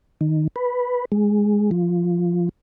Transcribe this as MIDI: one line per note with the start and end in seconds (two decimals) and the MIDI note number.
0.21 0.48 51
0.56 1.05 71
1.12 1.70 56
1.71 2.49 53